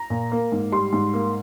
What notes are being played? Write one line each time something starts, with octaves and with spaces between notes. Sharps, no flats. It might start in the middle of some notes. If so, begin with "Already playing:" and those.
Already playing: A#5
A#2
A#3
G#2
G3 C6
G#2
A#3